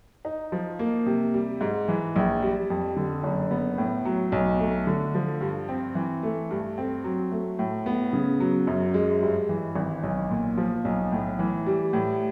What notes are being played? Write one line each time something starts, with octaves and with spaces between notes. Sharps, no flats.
D#4
F3
A#3
C3
G3
G#2
E3
A#1
G3
F2
D3
F#1
B3
A2
F#3
B1
A3
D3
F3
G2
C4
E3
A3
G2
C4
F#3
A3
A2
B3
C#3
F#3
F#2
G#3
G2
E3
G#1
B1
A#2
F3
B1
A2
E3
G3
A2